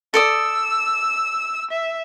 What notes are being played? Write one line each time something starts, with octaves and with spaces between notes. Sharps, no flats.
A4 D5 D#6 E6
E5